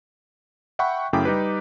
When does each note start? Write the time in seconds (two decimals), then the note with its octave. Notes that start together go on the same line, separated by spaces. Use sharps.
0.79 E5 F#5 G5 B5 C#6
1.13 F#2 C#3 A3 E4 G5 D6
1.25 G3 D#4 G4 B4